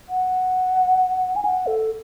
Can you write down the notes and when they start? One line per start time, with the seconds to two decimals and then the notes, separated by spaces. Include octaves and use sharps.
0.09 F#5
1.36 G#5
1.45 F#5
1.67 A4